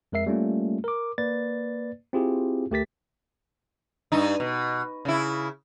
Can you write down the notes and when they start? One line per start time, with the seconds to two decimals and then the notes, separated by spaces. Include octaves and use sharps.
0.12 F2 G#3 A#4 E5 C7
0.26 G3 A3 A#3 C#4 F4
0.84 A#4 D6
1.18 A#3 B4 D5 A6
2.13 C4 E4 F4 G4 G#4
2.71 D2 A3 G4 A#4 A6 B6
4.12 G2 D#4
4.40 B2
5.05 C#3 E4